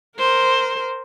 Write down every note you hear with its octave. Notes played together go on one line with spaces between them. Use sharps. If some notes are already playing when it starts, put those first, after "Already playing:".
A#4 C5